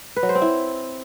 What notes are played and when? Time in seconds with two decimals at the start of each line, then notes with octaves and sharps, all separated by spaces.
0.16 B4
0.23 F#3
0.29 C5
0.35 C4
0.42 E4